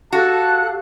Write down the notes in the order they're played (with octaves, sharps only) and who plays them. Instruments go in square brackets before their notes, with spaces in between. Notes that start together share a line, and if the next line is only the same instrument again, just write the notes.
[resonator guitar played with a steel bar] F#4 [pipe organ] G4 F5 [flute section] A4 F#6 [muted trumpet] A5